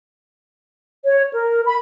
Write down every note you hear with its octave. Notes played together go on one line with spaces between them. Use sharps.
C#5
A#4
B5